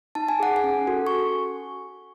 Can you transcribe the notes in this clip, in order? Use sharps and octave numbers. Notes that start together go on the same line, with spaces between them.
D#4 A5
G#5
G#4 F#5
G#5
C#4
F#4 A4
C#6